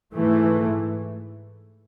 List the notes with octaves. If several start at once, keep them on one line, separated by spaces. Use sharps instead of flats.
G#2 E3 A3